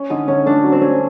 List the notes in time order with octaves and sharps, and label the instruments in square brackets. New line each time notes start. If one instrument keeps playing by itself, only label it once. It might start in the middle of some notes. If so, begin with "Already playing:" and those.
Already playing: [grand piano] C#4
[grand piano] D3 [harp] D#4
[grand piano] D3 [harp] C#4
[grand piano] A3 [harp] D4
[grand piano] F#3
[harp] C4
[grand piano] A3 [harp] C#4